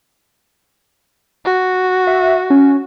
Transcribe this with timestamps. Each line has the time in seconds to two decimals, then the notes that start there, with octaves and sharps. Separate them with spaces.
1.45 F#4
2.07 E5
2.50 C#4